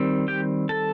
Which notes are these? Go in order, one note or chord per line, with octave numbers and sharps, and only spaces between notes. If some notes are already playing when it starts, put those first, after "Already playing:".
Already playing: D#3 G3 C4
G4 G5
A4 A5